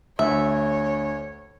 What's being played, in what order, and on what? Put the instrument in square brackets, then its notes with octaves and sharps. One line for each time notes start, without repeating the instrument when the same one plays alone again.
[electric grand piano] D2 [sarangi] C#5 [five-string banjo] E5